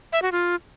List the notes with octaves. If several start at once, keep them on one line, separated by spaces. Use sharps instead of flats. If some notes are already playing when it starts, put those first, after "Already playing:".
E5
F#4
F4